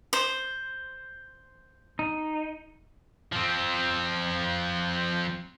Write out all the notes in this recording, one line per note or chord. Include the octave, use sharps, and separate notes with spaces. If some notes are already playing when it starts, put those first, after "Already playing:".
C5
D#4
F3 C4